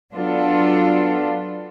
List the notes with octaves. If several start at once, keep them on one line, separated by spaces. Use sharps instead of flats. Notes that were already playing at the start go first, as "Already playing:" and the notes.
F#3 B3 D4 F4 A4